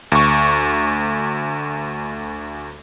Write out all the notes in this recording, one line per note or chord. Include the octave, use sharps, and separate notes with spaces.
D2 C#6